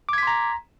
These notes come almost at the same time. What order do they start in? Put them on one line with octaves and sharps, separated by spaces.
D6 G#6 B6 C6 A#5